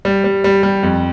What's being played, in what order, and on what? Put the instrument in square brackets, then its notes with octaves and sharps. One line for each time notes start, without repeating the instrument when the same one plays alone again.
[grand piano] G3
G3
G3
G3
F2